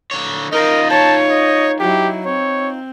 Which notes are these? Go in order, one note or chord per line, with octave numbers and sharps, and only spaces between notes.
D3 C#5
D#4 F4 A#4 D#5
C#5 A5
D#5
F#3 E4 G4
C4 C#5